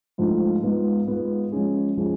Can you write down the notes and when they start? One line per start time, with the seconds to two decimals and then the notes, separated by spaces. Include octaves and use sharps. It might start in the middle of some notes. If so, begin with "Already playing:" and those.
0.18 G#2 F3 A3 D4 F4
0.63 G#2 G#3 B3 F4
1.08 G#2 G#3 B3 F4
1.52 F3 G#3 C#4 G#4
1.97 F3 G#3 C#4 G#4